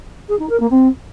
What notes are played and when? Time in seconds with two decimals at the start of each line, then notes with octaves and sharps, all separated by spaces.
0.29 G#4
0.39 D#4
0.50 A#4
0.60 A#3
0.71 C4